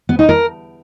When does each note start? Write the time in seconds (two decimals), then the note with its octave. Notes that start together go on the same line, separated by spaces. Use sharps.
0.09 B3
0.19 D#4
0.29 A#4